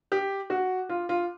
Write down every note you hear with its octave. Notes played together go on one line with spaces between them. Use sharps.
G4
F#4
F4
F4